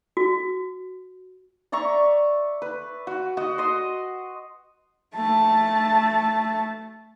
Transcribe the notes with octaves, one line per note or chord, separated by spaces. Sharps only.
F#4
D5 E5 A#5 C#6
B4
F#4
F#4 D#5
D#5 C6
A3 A5